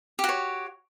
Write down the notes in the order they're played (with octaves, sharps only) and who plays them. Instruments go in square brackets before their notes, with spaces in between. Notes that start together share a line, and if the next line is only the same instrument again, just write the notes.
[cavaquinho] G4
F#4
C#5